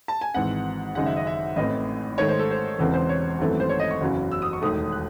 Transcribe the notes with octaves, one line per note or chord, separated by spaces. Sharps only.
A5
G#5
G#1 G#2 E3 C4 F#5
G#1 F#2 C#3 G#3 D#4 F#5
E5
D#5
E5
A1 A2 E3 C4 D#5
G#2 D#3 A3 C#5
C5
A4
C5
E1 E2 C#3 E3 C4 A4
C5
C#5
G#1 F#2 E3 A3 C4
C5
C#5
D#5
C#6
F#1 E2 C#3 F#3
E6
D#6
C#6
E1 D#2 D#3 A3 D#6
F#6